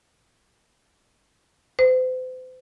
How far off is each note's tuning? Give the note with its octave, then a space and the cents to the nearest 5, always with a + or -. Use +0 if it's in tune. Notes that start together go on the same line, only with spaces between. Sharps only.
C5 -40